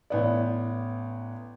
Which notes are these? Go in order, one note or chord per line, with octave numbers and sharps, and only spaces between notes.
A1 B3 D5